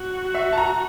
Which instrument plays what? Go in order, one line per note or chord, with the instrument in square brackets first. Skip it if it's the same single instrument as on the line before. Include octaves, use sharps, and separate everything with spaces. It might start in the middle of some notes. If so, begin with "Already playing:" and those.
Already playing: [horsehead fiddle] F#4
[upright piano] E5
A5
A#5